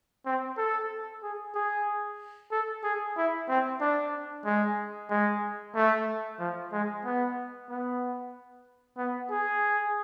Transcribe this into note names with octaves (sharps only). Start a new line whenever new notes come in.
C4
A4
G#4
G#4
A4
G#4
E4
C4
D4
G#3
G#3
A3
F3
G#3
B3
B3
B3
G#4